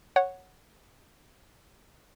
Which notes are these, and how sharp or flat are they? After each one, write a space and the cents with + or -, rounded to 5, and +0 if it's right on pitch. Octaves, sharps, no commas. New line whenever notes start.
C#5 -5 F#5 +0